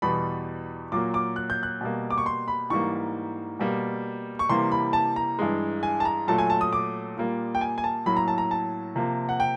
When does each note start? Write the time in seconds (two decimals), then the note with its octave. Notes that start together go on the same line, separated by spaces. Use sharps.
0.02 E2 B2 G3 B5
0.92 A#2 F#3 A#3 D6
1.14 D6
1.36 F#6
1.50 G6
1.63 F#6
1.81 B2 G3 A#3
2.11 D6
2.18 C#6
2.26 C6
2.48 B5
2.70 G#2 E3 G3 A#3 C#6
3.59 B2 G3 A#3
4.39 C#6
4.49 C3 E3 G3 A#3 C6
4.72 B5
4.93 A5
5.16 A#5
5.39 G2 E3 G#3
5.83 G#5
6.00 A5
6.05 A#5
6.28 A#2 F#3 A3 A5
6.38 G#5
6.50 A5
6.61 D#6
6.73 D6
7.17 A#2 G3 A#3
7.55 G5
7.61 G#5
7.78 G#5
7.84 A5
8.06 A2 F#3 A#3 B5
8.17 A#5
8.28 A5
8.38 A#5
8.51 A5
8.96 C3 F3 A#3
9.29 F#5
9.40 G5